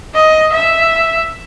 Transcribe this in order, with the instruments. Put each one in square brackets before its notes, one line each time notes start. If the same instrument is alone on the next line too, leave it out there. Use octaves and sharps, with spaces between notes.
[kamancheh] D#5
E5